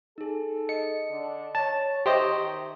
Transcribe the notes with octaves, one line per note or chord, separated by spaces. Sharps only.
D#4 G#4 A4
D#5 C#7
D3 D4
C#5 A5
D#3 G4 C5 D#5 E5 C6 C#6